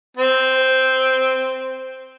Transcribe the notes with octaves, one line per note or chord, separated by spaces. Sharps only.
C4